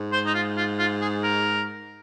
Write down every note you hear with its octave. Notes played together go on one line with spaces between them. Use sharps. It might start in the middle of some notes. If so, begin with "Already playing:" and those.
Already playing: G#2
C5
D#4
F4
F4
F4
G#4
A#4